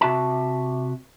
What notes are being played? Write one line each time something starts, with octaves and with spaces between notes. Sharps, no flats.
C3 F#4 E5 A5